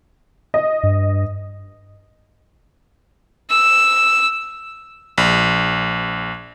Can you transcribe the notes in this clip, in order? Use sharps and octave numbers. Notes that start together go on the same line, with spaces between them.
D#5
G2
E6
A#1